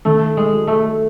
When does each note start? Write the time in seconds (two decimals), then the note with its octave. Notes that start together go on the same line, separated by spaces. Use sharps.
0.05 D#3 A3
0.37 G#3
0.53 F#3
0.67 A3